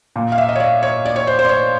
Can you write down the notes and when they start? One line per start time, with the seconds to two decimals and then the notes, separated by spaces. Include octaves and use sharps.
0.16 A#2
0.32 F5
0.38 E5
0.49 D#5
0.55 C#5
0.60 D5
0.83 C#5
1.05 D5
1.16 C#5
1.27 C5
1.39 C5
1.45 D5
1.49 C#5